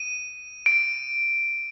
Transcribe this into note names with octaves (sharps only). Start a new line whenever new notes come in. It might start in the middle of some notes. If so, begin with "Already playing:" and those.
Already playing: D#7
D7